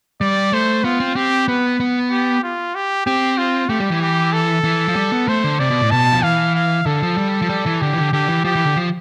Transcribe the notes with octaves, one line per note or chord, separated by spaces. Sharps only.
G3 D5
A3 C5
B3 F4
C4
C4 G4
B3 B4
B3
G4
F4
G4
C4 G4
F4
A3 G4
G3
E3
G4
A4
E3
F3
G3
B3
A3 C5
D3
C3 D5
B2
A2
B2 A5
F3
E3 F5
F5
D3 A4
F3
G3
F3
G3
E3
D3 G4
E3
D3
D3 G4
E3
F3 G4
E3
D3
F3